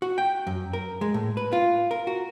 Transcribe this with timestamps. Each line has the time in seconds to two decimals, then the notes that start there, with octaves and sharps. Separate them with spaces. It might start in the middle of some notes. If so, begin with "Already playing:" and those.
0.02 F#4
0.18 G5
0.47 F#2
0.73 A#4
1.01 G#3
1.14 A2
1.37 B4
1.53 F4
1.91 A#4
2.07 F#4